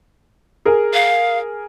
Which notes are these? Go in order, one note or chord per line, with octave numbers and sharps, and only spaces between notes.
G#4 A#4
F5